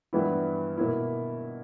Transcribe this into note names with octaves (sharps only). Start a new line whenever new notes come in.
G2 E3 G3 B3 E4
B2 A#3 E4